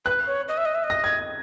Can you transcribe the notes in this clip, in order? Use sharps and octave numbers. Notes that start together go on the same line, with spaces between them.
B4 F#6
C#5
D#5
E5
D#5
E5
D#5
A#6
G#6